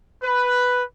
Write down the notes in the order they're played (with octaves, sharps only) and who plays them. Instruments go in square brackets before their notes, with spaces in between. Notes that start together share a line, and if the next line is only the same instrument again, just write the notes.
[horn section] B4